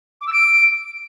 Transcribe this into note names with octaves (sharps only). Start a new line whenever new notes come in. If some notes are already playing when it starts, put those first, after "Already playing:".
D6
E6
D7